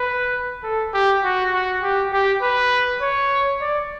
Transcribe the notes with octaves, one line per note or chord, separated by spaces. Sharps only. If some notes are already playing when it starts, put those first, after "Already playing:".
Already playing: B4
A4
G4
F#4
F#4
G4
G4
B4
C#5
D5